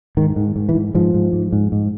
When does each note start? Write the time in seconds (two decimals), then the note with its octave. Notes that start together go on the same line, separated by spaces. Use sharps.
0.17 G#2 D#3
0.36 G#2
0.56 G#2
0.69 E3
0.75 G#2
0.95 G#2 F3
1.14 G#2
1.33 G#2
1.53 G#2
1.72 G#2